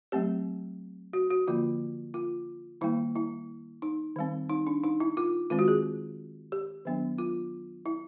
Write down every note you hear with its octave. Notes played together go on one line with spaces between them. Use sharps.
F#3 A3 C4 G4
F#4
F#4
D3 F3 A#3 F4
F4
D#3 G3 A#3 E4
E4
D#4
D#3 G3 C4
D#4
D4
D#4
E4
F4
D#3 G#3 C4 F4
F#4
G#4
G4
D#3 F#3 B3 D4
F4
E4